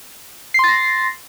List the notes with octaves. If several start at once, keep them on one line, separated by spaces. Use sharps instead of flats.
C6 A6 A#6 C7